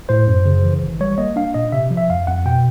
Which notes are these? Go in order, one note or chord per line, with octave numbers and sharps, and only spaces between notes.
A2 C5
F#2
C#3
E3
G#1
G3 C#5
A#3 D#5
D4 F5
A#2 D#5
C3 E5
F3
E5
F2 F5
F2 F#5
B2 G5